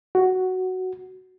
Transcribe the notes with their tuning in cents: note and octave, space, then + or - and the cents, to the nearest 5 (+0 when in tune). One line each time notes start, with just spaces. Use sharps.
F#4 +5